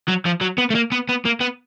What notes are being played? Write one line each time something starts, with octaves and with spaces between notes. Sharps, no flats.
F#3
F3
F#3
B3
A3
A#3
B3
B3
A#3
B3